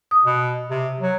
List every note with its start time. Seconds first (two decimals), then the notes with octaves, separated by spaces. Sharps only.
0.11 D#6
0.25 B2
0.70 C3
1.00 F#3